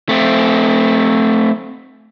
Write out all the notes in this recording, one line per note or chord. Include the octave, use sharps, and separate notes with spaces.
A3 C4